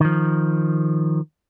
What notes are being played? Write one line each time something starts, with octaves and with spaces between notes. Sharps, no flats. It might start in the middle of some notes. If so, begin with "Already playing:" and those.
D#3 F3